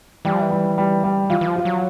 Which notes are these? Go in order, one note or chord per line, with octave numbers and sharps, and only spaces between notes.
E3 G3
F3
E3
G3
G3
G3
E3 F4
E3
F3
F4
F#3